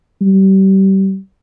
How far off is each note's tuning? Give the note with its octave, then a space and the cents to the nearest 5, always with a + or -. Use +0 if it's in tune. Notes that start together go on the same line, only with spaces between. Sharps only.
G3 -30